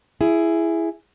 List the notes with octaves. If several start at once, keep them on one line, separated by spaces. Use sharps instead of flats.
E4 G#4